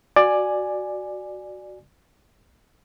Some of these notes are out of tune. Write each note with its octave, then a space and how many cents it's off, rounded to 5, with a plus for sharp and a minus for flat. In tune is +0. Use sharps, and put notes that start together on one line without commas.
F#4 +0 D5 +15 G#5 +0